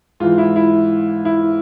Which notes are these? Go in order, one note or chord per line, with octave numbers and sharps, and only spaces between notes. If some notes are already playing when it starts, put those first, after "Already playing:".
G#2 E3 F4
E4
E4
E4